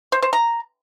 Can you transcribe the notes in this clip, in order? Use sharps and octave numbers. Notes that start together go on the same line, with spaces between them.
C5
C5
A#5